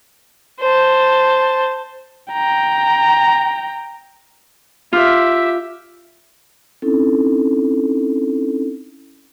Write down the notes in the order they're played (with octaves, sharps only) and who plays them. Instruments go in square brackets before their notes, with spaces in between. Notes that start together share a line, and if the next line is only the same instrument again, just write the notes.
[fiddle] C5 A5
[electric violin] G5 A#5
[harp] F4 [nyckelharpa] G4 E5
[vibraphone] C4 C#4 D#4 E4 A4